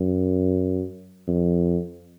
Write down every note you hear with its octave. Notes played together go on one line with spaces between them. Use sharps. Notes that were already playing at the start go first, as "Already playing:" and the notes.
Already playing: F#2
F2